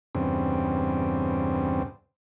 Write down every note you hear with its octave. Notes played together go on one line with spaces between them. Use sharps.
E2 G2 C#3 C4